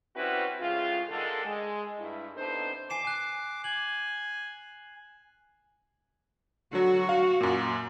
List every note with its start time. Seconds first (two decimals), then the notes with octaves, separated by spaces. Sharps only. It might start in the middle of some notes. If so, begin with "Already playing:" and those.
0.16 G3 C4 C#4 E4 F#4 B4
0.60 A2 C#3 G#3 F4
1.09 D3 D#3 G#3 A4
1.45 G#3
1.99 G2 E4
2.36 C3 B3 D4 D#4 A4 C5
2.90 G#5 D6 C7 E7
3.05 G#5 F#6
3.64 G#5 F#7
6.73 D3 F#3 F#4
7.09 F5
7.41 F#2 A#2